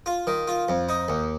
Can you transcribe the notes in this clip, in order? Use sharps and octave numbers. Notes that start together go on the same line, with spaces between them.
F4
D#3
F4
F2
D#4
D#2